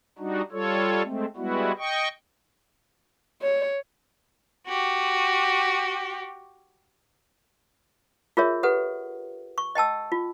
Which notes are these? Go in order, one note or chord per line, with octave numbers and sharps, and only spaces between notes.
G3 D4 D#4 F#4
G3 F4 A4 C#5
G#3 A3 C4
G3 G#3 B3 E4 F#4
D#5 G5 C#6
C#5
F#4 G4
F4 G#4 A#4 C#5 E5
G4 A4 B4 F#5
C#6
D#5 G5 A5 E6
F4